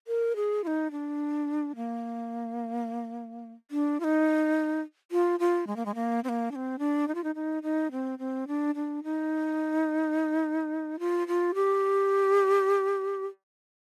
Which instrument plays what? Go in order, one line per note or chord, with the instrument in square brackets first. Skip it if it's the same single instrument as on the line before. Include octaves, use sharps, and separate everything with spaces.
[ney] A#4
G#4
F4
D#4
D4
A#3
D4
F4
D#4
F4
F4
G#3
A#3
G#3
A#3
C4
A#3
D4
C4
D4
D#4
F4
D#4
D#4
D#4
C4
C4
D4
D4
D#4
F4
F4
G4